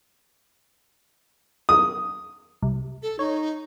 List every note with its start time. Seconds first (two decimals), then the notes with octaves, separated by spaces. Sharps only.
1.69 D#6
2.62 C2
3.02 A4
3.19 D#4 C#5